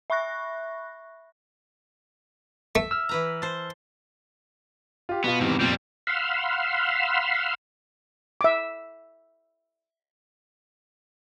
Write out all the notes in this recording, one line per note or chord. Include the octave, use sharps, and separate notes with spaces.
E5 B5 C#6 F#6 A#6
A3 E5
E6 F6
E3 B4 A#5
C5 A5
F4 G4
B2 B3 F4
E2 G#2 C3 D#3 E3
F2 A#2 G3 C4
F5 F#5 B5 C6 E6 F6
E5 D6